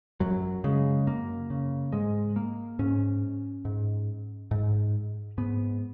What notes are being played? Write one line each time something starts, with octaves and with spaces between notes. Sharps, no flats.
F#2 F#3
C#3 G#3
F#2 A#3
C#3
G#2 G#3
A#3
G#2 C#4
G#2
G#2
G#2 B3